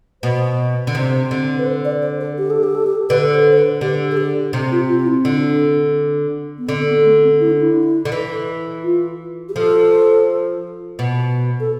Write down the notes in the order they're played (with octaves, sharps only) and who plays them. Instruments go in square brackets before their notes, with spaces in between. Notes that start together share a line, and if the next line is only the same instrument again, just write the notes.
[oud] B2 [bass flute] C5
[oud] D3
[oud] C3 [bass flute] C5
[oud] D3
[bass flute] B4
C5
D5
C5
A4
G4
A4
G4
A4
G4
[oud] D3 [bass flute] B4
[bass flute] C5
C5
B4
[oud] D3 [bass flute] G4
[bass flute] A4
G4
[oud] C3 [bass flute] G4
[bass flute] F4
F4
F4
E4
[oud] D3 [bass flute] D4
[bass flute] B3
[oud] D3 [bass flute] C4
[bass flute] B3
A3
C4
E4
D4
E4
[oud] D3
E3
[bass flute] F4
G4
[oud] F3 [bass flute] A4
[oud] B2
[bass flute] A4